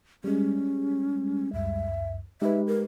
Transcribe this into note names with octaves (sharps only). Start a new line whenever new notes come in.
G3 G#3 C#4
C#2 F#2 E5
G#3 D#4 G4 B4 E5
A#4